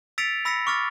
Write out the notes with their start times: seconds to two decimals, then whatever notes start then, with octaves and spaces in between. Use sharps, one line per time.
0.18 E6 A6 B6 C#7 D7 F7
0.45 B5 E6 A#6 B6 C#7
0.67 C#6 D6 F6 A6